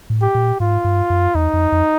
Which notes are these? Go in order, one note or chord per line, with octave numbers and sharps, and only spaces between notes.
A2
G4
A#2
G#2 F4
G2
F#2
E2 D#4
F2
F2